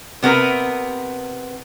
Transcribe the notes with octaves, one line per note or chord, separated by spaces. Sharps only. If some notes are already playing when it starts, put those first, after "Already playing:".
C3 B3 F4 A#4 B4